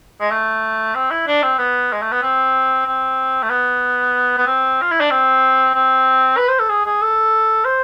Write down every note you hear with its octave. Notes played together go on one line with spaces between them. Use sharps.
G#3
A3
C4
E4
D4
C4
B3
G#3
A3
B3
C4
C4
A3
B3
B3
C4
F4
E4
D4
C4
C4
B4
C5
A4
G#4
G#4
A4
C5